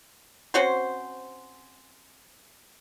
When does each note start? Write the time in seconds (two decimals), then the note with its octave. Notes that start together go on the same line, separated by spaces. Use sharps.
0.54 C4 C#4 F#4 C5